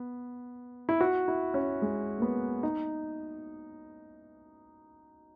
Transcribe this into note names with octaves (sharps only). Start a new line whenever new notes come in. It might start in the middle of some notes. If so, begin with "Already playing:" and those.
Already playing: B3
E4
F#4
E4
C#4
G#3
A#3
B3
D#4